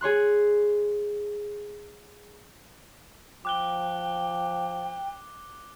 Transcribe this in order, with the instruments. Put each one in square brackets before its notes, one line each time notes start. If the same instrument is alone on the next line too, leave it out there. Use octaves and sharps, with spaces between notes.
[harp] G#4 C#5 C6 F#6
[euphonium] F3 [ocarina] G5 [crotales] D6 F#6 G7